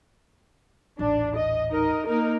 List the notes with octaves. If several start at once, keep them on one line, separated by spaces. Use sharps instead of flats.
D#1 A1 D4
D#5
D#4 A#4 D#5
A#3 D#4 A#4